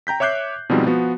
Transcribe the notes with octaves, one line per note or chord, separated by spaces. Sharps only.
G5 A#5 G6 B6
C#5 E5 D6 F#6 G6 C7
B2 F3 G3 G#3 C4 D#4
F3 B3 F#4